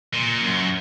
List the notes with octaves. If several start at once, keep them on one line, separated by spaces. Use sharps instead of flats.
A#2
F#2